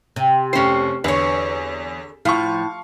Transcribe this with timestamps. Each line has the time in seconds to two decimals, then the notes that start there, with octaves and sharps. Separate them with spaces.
0.16 C3
0.53 F1 C#4 C5 C7
1.04 E2 D3 B4 C#5
2.25 A2 F3 F5 C#6